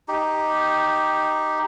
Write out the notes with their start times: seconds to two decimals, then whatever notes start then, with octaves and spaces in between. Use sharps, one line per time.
0.08 D#4 G4